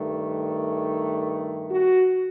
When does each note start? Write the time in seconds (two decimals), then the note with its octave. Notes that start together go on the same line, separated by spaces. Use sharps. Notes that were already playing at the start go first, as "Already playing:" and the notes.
Already playing: G2 D#3 A3
1.68 F#4